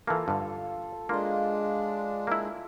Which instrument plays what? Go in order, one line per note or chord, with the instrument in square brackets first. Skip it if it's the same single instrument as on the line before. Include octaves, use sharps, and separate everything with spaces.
[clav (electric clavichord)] E3 A#3 [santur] F4 A4 F5
[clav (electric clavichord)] G2 D3
[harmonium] G#3 D4 [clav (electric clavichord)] A#3 [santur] F4 D#5
[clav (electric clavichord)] A#3 E4